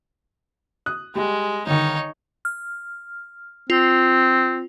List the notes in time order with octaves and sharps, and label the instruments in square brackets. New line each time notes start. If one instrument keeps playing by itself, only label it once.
[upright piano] D#6 F#6
[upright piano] G3 G4 [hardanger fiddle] G#3
[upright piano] G1 D#3 [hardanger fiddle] D#4 C#5
[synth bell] F6
[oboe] C4 [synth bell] F4